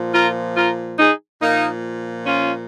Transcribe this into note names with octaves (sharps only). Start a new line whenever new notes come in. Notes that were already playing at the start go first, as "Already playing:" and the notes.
Already playing: A#2 F3
F4 A#4
F4 A#4
D#4 G#4
A#2 F3 A#3 D#4
C#4 F4